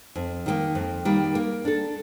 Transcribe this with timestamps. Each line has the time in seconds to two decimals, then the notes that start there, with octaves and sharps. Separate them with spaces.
0.16 F2
0.46 D#3 G3 A#3
0.75 F2
1.05 D#3 G3 A#3
1.35 A#3
1.65 D4 A4